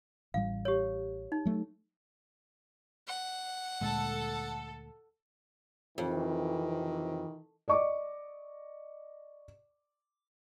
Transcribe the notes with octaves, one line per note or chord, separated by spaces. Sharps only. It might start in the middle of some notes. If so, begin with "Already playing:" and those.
A1 A2 G3 F5
G4 C#5
D#4
F#3 A3
F#5
D2 A#2 G#3 A4
F2 C3 D#3 E3
D5 D#5 C#6 D6